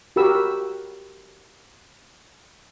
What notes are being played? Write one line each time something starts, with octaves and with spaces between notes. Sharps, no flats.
F#4 G4 A#4 B5 E6